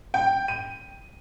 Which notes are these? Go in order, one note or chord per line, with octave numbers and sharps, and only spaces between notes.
G5
D#7